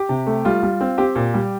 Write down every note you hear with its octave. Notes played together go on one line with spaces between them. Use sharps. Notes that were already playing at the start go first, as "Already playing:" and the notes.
Already playing: G4
C3
A3
G3 F4
G3
C4
C4 G4
A#2
G3